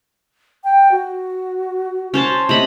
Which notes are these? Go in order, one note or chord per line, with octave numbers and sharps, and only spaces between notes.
G5
F#4
C#4 C5 A5
C3 D#5 B5